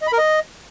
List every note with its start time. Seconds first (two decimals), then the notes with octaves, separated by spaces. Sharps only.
0.02 D#5
0.07 B5
0.13 A#4
0.18 D#5